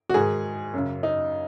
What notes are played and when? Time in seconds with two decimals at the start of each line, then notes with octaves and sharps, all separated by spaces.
0.09 F#4
0.14 G#2 D#3 G#4
0.74 F#2 C#3
1.03 D#4